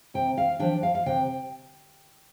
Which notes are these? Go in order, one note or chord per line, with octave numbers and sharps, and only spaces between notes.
C3 G5
F5
F3 D4 G5
F5
F5
C3 G5